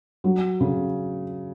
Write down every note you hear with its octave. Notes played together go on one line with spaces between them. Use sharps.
F#3
C#3